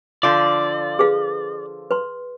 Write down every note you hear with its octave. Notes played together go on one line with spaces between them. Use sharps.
D3 F3 F4 D5
G#4 B4 F5
B4 C6